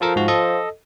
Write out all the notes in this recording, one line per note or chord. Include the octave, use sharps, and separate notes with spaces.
F3 F4 A4 A#4
G#2 F#4
A4 D#5